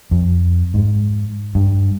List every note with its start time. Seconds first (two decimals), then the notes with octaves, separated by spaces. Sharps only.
0.11 F2
0.74 G#2
1.55 G2